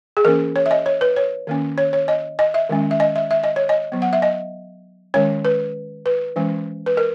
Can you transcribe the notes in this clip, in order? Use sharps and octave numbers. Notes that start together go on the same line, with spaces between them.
G#4
E3 A#3 C#4 A#4
C#5
E5
D#5
C#5
B4
C#5
D#3 A#3 C#4
C#5
C#5
D#5
D#5
E5
D#3 G#3 C#4
E5
D#5
E5
E5
D#5
C#5
D#5
F#3 B3
F#5
E5
D#5
D#3 G#3 C#4 C#5
B4
B4
E3 G#3 C#4
B4
A#4